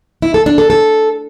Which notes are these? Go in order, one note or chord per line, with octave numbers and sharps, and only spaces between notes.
E4
A4
D4
A4
A4